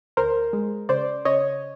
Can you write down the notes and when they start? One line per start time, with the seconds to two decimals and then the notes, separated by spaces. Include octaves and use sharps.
0.17 D2 A#4 C5
0.53 G#3
0.89 C#3 C5 D5
1.25 C#3 C#5 D#5